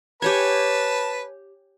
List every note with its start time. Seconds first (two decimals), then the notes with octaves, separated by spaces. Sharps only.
0.22 G4 B4 C#5 G#5 A5